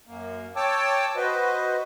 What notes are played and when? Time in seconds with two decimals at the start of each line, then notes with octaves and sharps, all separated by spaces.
0.07 F#2 A#3
0.56 C#5 G5 A5 D6 E6
1.16 F#4 B4 C5 D#5